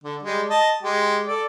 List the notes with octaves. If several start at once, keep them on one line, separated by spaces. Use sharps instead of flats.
D3
G3 G#3
D#5 A5
G#3 G4
A4 D5